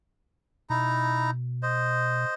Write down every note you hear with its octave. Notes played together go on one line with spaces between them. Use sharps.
B2 D#4 E4 A#5
C5 D#5